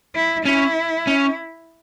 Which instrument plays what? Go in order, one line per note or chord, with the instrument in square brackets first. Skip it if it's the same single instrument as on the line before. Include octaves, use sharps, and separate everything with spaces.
[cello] E4
[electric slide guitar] C#4 [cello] E4
[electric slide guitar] C#4